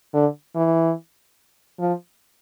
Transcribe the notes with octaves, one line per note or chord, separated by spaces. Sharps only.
D3
E3
F3